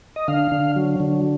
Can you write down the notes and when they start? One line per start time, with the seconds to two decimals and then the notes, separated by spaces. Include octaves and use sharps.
0.16 D#5
0.28 D3 F5
0.52 D3
0.76 F#3
1.00 D3